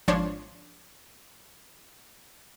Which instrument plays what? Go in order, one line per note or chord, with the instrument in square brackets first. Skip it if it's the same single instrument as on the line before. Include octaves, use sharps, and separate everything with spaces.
[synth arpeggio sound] G#1 F3 D4 C#5 C6